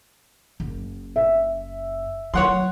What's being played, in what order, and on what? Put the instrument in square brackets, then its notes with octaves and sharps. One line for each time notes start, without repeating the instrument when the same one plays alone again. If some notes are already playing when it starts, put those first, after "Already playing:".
[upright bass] F#1
[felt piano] E5
[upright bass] F#3 B3 [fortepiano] C#5 F#5 C6